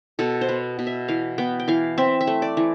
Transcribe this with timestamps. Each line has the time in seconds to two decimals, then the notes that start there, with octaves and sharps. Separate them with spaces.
0.19 B2 A4
0.41 C5
0.49 B3
0.79 B2
0.87 E5
1.08 E3 F5
1.38 B3 G5
1.60 G5
1.68 E3 F5
1.98 C4 E5
2.21 E5
2.27 A3
2.42 D5
2.57 E3